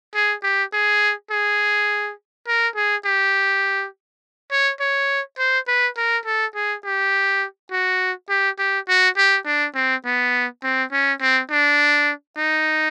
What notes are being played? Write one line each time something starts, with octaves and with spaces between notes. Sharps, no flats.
G#4
G4
G#4
G#4
A#4
G#4
G4
C#5
C#5
C5
B4
A#4
A4
G#4
G4
F#4
G4
G4
F#4
G4
D4
C4
B3
C4
C#4
C4
D4
D#4